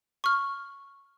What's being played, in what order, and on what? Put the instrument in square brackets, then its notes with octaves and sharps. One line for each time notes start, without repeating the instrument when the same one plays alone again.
[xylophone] C#6 F6